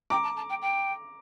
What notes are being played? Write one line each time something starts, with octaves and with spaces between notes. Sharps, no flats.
G5 A#5 D6
A5
A5
G5
G5